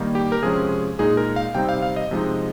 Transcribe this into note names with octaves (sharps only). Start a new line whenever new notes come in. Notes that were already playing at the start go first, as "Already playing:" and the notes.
Already playing: D#3 G3 A#3 D#4
G4
A#4
C3 F3 G#3 C#4 G#4
A#2 G#3 D#4 G#4
A#4
F5
C3 G3 C4 D#4 G5
F5
F5
D#5
C3 F3 G#3 D#4